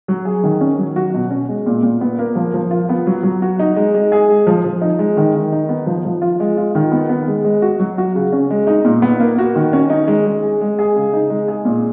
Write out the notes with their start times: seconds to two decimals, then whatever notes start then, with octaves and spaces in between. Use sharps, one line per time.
0.08 F#3
0.25 G#4
0.44 D#3
0.61 C#4
0.78 F#3
0.96 F#4
1.14 B2
1.30 C#4
1.49 G#3
1.66 A#2
1.83 A#2
2.01 B3
2.19 A#3
2.36 F3
2.54 F3
2.71 F4
2.89 B3
3.07 F#3
3.23 F#3
3.42 F#4
3.59 D#4
3.76 G#3
3.94 G#3
4.12 G#4
4.29 G#3
4.47 F3
4.64 F3
4.81 D#4
4.99 G#3
5.17 D#3
5.35 D#3
5.52 D#4
5.69 B3
5.86 F3
6.05 F3
6.21 F4
6.40 G#3
6.57 F4
6.75 D#3
6.92 B3
7.09 B3
7.28 G#3
7.44 G#3
7.62 F#4
7.79 F#3
7.98 F#4
8.15 C#3
8.33 C#4
8.50 G#3
8.67 D#4
8.85 A#2
9.02 B3
9.20 A#3
9.38 F#4
9.56 D#3
9.73 C#4
9.90 D#4
10.08 G#3
10.26 G#3
10.43 G#4
10.61 G#3
10.79 G#4
10.96 C#3
11.13 D#4
11.30 G#3
11.48 G#4
11.65 A#2